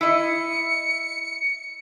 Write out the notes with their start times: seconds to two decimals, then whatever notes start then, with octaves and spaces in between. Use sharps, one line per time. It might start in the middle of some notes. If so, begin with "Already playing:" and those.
0.01 E4 D#5 C#7